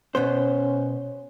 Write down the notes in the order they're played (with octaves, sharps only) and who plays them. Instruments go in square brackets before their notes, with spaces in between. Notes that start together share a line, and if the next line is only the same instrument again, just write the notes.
[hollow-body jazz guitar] B2 B3 C5 [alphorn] C#4